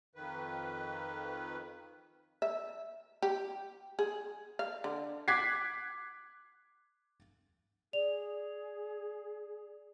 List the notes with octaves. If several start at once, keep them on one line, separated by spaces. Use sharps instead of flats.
F2 D#3 B4
E5
G4
G#4
F5
D3
D6 F#6 G#6 B6 C7
G#4 D5 F7